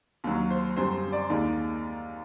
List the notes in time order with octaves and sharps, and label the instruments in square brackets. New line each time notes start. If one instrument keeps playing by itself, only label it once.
[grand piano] D#2 D#3 F#3
C5
F#2 D3 G3 C5
D5
D#2 D#3 G#3